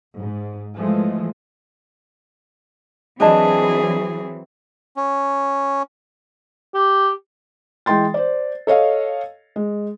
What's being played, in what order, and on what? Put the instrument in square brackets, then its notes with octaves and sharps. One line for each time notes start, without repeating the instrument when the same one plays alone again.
[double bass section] G#2
E3 F3 G#3 A3
[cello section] E3 F#3 C4 [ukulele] D4 D#5 A5 [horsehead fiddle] G#4
[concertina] C#4
[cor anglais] G4
[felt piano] E3 G#3 G5 C6 A6
C5 D5
A4 C#5 D#5 F5
G#3